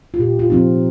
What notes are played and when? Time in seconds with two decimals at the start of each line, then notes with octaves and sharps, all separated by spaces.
0.14 F4
0.19 A#2 G4
0.39 F4
0.50 F3 C4 D#4